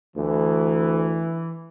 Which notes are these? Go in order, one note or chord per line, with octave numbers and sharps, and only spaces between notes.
D2 E3